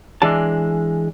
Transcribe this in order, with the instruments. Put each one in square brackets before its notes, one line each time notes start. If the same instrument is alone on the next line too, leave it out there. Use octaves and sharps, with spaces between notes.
[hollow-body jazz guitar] E3 G#3 D4 A5